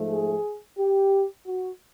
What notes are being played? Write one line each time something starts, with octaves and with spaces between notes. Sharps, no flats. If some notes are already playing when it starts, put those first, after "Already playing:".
Already playing: G#2 F3 A3
G#4
G4
F#4